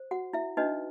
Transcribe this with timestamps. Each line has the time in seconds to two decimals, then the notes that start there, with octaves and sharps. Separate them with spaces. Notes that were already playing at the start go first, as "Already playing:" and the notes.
Already playing: C5
0.11 F#4 F#5
0.33 E4 E5
0.57 D4 D#4 F#4 B4 D#5